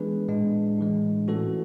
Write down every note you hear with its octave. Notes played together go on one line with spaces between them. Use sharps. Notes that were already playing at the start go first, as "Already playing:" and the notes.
Already playing: E3 G#3 B3 D4 G#4 B4
A2 G#3 D4
A2 E3 G#3
E3 A3 C#4 F#4 A4